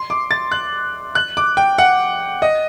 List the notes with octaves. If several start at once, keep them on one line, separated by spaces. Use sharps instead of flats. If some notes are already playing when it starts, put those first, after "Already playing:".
Already playing: C6
D6
A6
F#6
F#6
D6
G5
F#5
D#5